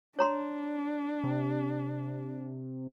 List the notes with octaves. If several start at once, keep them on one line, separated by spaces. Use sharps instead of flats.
D4 C#5 A#5 C6
C3